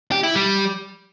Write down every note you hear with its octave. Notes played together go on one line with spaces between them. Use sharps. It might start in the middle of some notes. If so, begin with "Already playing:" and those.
G4
E4
G3